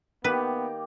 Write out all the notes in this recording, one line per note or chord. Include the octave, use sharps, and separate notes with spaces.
D#3 A#3 B3 G4 B4